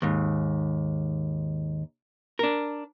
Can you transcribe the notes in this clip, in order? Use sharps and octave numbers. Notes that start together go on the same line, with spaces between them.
D#2 G#2
D4 A#4